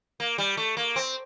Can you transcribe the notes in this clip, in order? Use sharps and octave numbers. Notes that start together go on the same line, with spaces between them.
A#3
G3
A3
A#3
C4